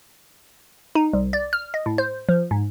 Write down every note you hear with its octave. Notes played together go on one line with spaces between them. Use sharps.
D#4
C2
D5
F6
D#5
A2
C5
F3
G#2